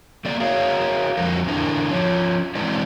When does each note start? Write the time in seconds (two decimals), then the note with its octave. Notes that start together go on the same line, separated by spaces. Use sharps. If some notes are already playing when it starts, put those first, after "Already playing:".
0.25 A3 A#3 D5
0.40 F#4 G#4 A#4 C#5 F5
1.17 F2 F3 A#4
1.48 E2 A2 D3 D4 E4 A#4
1.90 F3 C#4
2.55 E3 G#3 C4 E4 B4 D5